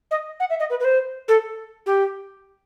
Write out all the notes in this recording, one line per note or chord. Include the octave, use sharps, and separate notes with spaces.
D#5
F#5
E5
D#5
B4
B4
C5
A4
G4